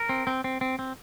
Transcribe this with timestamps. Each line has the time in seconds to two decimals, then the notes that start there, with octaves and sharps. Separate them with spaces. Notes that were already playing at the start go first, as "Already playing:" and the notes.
Already playing: A#4
0.09 C4
0.27 C4
0.44 C4
0.61 C4
0.79 C4